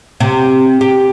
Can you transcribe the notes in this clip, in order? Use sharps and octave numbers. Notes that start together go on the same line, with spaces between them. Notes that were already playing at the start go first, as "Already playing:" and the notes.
C3
G4